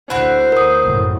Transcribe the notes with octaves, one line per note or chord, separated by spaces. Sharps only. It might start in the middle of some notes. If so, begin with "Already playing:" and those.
D2 E4 F#4 C5
A#4 D#6
F#1 A2